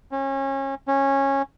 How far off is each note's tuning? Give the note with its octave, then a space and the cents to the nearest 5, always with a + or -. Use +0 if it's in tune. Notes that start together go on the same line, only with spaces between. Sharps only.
C#4 -30
C#4 -15